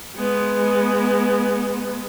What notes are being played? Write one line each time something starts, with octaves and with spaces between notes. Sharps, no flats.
G#3 B3